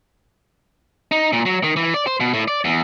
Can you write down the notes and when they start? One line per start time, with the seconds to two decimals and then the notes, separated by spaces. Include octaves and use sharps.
1.12 D#4
1.33 A#2
1.46 F#3
1.64 D#3
1.76 E3
1.94 D5
2.07 C5
2.20 B2
2.34 A2
2.48 D5
2.65 E2